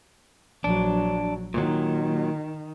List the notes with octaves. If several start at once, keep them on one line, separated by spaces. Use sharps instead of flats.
A#1 F#3 D4
A#2 D#3 F#3